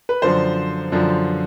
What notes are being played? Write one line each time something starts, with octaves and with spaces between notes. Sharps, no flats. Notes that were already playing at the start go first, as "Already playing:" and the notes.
B4
F#2 D3 F3 C5
F#2 D3 F3